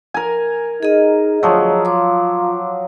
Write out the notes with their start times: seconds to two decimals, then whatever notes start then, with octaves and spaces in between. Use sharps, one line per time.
0.14 A#4 G#5
0.83 D#4 G#4 D#5
1.43 D2 F3 F#3
1.85 F4 C6 D6